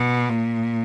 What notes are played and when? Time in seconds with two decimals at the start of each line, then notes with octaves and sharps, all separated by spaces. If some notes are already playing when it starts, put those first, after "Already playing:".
Already playing: B2
0.30 A#2